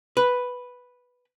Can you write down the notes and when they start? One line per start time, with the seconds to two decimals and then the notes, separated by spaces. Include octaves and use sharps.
0.17 B4